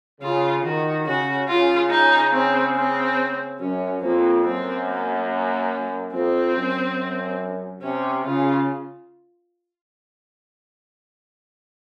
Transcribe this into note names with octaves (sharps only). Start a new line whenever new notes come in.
C#3 F4
D#3 F#4
C#3 F#4
C#3 F4
D#4
C4
C4
F#2 C#4
F2 A#3
F#2 C4
A#3
A#3
F2 C4
F#2
C3 C#4
C#3 F4